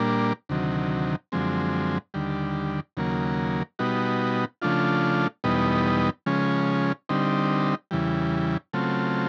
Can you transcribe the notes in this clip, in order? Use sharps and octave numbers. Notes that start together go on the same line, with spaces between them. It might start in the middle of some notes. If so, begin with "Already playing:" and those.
Already playing: A#2 G3 A#3 D4
D2 C3 D#3 F#3
F#2 D3 F3 G#3 C4
D#2 D3 G3
D#2 C#3 F#3 A#3
B2 G3 B3 D#4 F#4
C#3 F3 A3 D4 F4
E2 B2 G3 B3 D#4
C#3 F3 G#3 C#4
D3 G3 C4 D#4
E2 C#3 E3 G3
C#3 F#3 A3 C4 F4